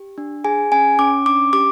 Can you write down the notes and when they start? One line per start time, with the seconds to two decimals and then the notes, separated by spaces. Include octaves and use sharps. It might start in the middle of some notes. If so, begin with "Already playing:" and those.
Already playing: G4
0.18 D4
0.45 G#4 G#5
0.72 C#4 G#5
0.99 C#4 D6
1.26 D4 D6
1.53 G4 D6